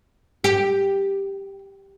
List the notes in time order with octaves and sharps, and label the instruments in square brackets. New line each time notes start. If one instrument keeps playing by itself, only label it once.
[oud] G4